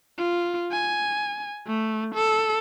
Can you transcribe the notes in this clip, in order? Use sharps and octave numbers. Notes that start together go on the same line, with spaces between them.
F4
G#5
A3
A4